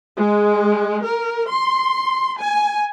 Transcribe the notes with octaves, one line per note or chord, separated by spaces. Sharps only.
G#3
A#4
C6
G#5